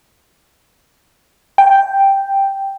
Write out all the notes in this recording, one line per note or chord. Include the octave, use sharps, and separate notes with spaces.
G5